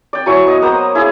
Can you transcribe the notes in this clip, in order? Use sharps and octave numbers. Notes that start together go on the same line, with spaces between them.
D5 G5
F#3 E4 G#5 C#6
B3 D#5
A#3 B3 C5 D#6
E4 G#4 F5